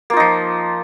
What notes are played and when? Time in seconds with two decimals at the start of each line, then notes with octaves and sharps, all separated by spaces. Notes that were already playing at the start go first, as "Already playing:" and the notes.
0.10 A#3
0.13 F4
0.17 D#4
0.20 F3